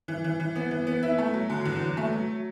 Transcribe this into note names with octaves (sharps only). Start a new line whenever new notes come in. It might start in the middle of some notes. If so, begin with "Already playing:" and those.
E3
E3
E3
B3
E3
B3
E4
A3
F#3
D3
E2
F#3
A3
F#3